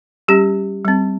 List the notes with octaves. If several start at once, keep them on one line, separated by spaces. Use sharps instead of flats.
G3 C#4 G4
G3 C4